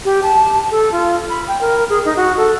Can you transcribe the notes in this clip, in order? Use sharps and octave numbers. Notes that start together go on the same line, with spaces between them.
G4
A5
A4
F4
B5
G5
A#4
G#4
D#4
F#4
A4